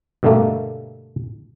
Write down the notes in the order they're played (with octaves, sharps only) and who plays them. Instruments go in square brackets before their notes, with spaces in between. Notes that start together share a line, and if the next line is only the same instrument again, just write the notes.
[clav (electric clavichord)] G2 B2 D3 G3 A3 A#3